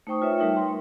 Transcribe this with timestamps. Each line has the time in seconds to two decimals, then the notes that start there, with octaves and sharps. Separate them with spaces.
0.07 A3 D#4 C5 G5 C#6 D#6
0.22 F4 B4 C#5 E5
0.38 G3 A3 D#4 A#4 E5 G5
0.56 C6